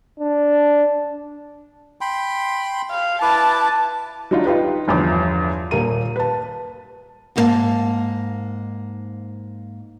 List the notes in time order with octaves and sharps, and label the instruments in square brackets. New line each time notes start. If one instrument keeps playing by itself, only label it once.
[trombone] D4
[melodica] G5 B5 C6
[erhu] F5
[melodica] E4 B4 D6 [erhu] A5
[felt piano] F#3 D4 D#4 F4
D#4 F4 G4 B4
G1 E2 F3 D6
D#1 A#3 D#7
B4 A5
[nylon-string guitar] G#2 A#3 F4 A#4 F5 A5